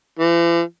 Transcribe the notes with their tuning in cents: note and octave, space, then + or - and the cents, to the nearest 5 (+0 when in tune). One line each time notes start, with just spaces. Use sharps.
E3 +45